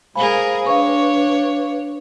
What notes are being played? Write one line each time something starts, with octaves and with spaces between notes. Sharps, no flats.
G#3 G#4 A#4 C5 F5 G#5 B5
D4 B4 C#5 F5 C#6